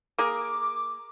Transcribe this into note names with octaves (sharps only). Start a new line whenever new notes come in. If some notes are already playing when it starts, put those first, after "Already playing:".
A#3 G#4 A#4 D6